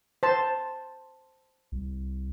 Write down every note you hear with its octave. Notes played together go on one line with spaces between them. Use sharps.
C5 A5
C2